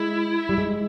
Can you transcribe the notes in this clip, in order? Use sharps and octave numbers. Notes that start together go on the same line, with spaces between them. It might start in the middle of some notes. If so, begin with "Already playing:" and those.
Already playing: G#3 E4
G3
G#3